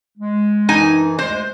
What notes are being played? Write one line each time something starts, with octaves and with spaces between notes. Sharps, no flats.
G#3
F#2 E3 D#4 G#5
D2 G#3 C5